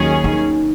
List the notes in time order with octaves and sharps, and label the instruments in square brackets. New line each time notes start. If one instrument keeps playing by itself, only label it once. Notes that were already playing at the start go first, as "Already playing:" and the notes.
Already playing: [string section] D#2 D#3 F#3 C#4 G#4
[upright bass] D#4